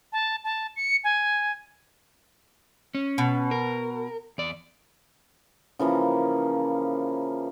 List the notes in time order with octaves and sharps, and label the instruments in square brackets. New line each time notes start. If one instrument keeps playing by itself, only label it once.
[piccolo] A5
A5
C#7
G#5
[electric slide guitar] C#4
[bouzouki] B2
[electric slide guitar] A#4
E2 D5
[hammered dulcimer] C#3 E3 F3 A#3